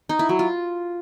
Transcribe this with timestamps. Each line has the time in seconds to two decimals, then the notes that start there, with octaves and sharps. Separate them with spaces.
0.09 D#4
0.19 E4
0.29 F#3
0.39 F4